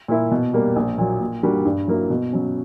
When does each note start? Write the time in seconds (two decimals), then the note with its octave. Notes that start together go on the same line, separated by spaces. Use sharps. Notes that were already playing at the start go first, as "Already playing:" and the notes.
0.08 A#2 A#3 E4
0.31 B2
0.53 G3 A#3
0.76 A#1
0.98 A#2 F#3
1.21 A#2
1.43 G3 A#3 D4 F#4
1.65 G2
1.88 F#3 A#3 E4
2.10 B2
2.33 F#3 C#4